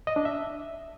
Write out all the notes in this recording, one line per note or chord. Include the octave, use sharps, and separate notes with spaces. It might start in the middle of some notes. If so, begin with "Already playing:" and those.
D#5
D4
E5